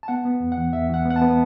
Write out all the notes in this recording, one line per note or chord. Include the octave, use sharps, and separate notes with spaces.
A5
B3 F#5
B3
E2
F#5
E3
E2 E5
E3 F#5
B3
F#5
A5
B3